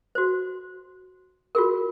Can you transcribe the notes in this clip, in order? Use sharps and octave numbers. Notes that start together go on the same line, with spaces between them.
F#4 C5
F4 F#4 G#4 A#4